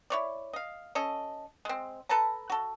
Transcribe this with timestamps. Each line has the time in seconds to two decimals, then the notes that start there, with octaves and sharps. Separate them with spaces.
0.10 E4 C#5 D5
0.53 D#5 F5
0.95 C#4 A4 D#5
1.65 G#3 C4
2.09 A4 B4 A5 A#5
2.50 F#4 A4